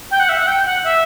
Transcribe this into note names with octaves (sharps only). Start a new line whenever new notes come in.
G5
F#5
E5
F#5
G5
F#5
E5